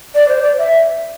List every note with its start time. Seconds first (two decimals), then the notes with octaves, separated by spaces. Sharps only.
0.15 D5
0.28 C5
0.41 D5
0.59 E5